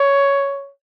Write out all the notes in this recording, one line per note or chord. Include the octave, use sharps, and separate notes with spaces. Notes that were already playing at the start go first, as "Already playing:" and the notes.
Already playing: C#5